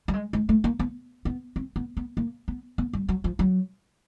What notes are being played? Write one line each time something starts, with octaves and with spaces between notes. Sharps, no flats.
G3
G#3
G#3
A3
A#3
B3
B3
C4
B3
B3
A#3
B3
B3
G3
F#3
F3
F#3